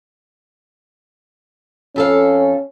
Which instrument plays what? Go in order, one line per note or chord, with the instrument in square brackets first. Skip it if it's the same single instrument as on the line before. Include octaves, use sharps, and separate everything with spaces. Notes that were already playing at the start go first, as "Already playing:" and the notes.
[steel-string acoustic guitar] F2 A4 F5 [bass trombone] C#4